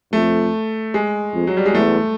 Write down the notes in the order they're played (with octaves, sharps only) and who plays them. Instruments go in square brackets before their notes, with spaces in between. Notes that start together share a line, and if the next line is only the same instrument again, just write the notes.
[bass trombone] F2 [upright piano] A3
[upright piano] G#3
[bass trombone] F2
[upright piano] F#3
G3
G#3
[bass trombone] E2 [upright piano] A3